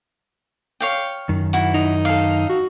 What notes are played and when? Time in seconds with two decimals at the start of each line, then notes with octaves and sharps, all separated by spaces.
0.81 C#5 F5 G5
1.29 F#2 D#3
1.53 E4 F#4
1.74 D#4
2.05 A4 F5
2.50 F#4